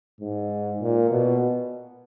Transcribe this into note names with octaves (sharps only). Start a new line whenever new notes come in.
G#2
A#2
B2